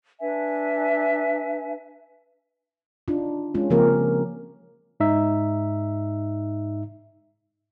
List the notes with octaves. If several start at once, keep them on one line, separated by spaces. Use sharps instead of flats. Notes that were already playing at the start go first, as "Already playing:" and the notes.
D4 B4 E5 G#5
D4 D#4 F4
G#3 C#4 F4
C#3 F3 A#3 C4 G4 A#4
G#2 D#4 E5